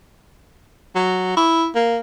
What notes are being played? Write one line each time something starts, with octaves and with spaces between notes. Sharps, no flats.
F#3
E4
A#3